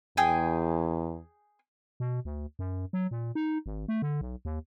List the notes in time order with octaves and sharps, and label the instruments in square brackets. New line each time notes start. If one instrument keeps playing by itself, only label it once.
[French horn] E2 [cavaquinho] G#4 G5 G#5
[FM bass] B2
D2
F#2
F#3
A#2
D#4
G#1
A3
D3
B1
D#2